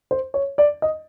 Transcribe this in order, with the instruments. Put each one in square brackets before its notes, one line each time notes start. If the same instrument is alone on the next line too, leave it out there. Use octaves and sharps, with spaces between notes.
[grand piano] C5
C#5
D5
D#5